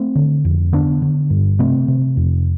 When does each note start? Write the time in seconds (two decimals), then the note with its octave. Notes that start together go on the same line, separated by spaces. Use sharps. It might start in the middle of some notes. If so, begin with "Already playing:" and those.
Already playing: A3 C4
0.15 D3
0.45 F2
0.72 D3 B3 D4
1.02 D3
1.30 G2
1.59 C3 A3 C4
1.88 C3
2.17 F2